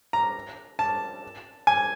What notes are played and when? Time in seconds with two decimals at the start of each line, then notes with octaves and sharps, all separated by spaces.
0.13 A#5
0.79 A5
1.67 G#5